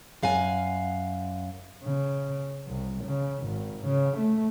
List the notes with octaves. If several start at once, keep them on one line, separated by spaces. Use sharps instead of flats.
F#2 F5 F#5 G#5
C#3
C2
C#3
G#1
C#3
A3